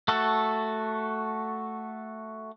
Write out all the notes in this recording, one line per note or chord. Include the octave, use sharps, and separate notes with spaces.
A3 F#4 A4